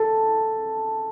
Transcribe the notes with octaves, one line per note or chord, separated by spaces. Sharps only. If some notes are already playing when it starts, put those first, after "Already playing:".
Already playing: A4 A5